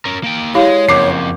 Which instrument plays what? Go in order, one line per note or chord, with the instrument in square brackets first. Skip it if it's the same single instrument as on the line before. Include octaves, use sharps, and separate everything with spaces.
[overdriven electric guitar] C#4 A#4
A#3 G5
[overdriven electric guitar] G#3 [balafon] E4 G4 F5 [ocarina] C#5
[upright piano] F#1 D6 C7 [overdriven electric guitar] F2